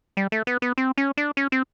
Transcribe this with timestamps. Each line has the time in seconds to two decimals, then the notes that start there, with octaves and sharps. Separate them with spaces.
0.17 G3
0.32 A3
0.47 B3
0.62 B3
0.78 C4
0.98 C#4
1.17 D4
1.37 C#4
1.52 C4